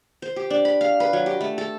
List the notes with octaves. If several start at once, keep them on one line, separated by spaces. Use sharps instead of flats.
C5
G4
D4
B5
F5
B4
F#3
G4
A3
A4